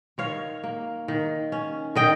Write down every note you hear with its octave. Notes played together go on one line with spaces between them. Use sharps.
D#3 C#5 F5
A#3
D#3
C#4
D#3 D#5 G5